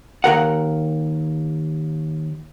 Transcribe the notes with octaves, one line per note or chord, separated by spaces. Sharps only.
D#2 A#4 F#5